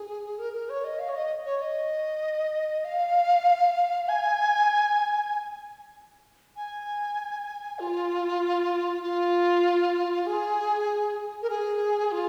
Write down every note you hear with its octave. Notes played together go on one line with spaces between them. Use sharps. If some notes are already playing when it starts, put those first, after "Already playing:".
Already playing: G#4
A#4
A#4
C#5
D#5
F5
C#5
D#5
C#5
D#5
F5
G#5
G#5
F4
F4
G#4
A#4
G#4
F4